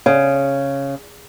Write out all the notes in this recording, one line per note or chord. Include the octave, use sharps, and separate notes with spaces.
C#3